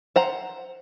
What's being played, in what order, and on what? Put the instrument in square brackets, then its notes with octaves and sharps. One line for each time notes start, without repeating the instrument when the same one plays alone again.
[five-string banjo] C5 F#5 A#5